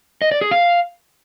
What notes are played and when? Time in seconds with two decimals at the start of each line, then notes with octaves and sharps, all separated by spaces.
0.22 D#5
0.31 D5
0.41 G#4
0.51 F5